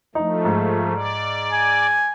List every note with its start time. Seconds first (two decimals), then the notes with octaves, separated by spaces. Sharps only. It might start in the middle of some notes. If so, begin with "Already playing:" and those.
0.15 F3 A3 D#4
0.45 G#2
0.94 D5
1.52 G#5